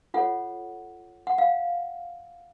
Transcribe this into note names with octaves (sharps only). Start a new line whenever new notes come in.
F4 A4 C#5 F#5
F#5
F5